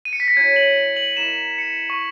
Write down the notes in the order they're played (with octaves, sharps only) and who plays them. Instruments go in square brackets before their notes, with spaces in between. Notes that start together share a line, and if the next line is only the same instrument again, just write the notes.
[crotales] D#7
C#7
B6
A#6
[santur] F#3 C#4 E4 [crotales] G#6
[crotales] F#7
F#7
[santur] A#3 E4 B4 D#5 [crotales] E7
[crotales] C#7
C#6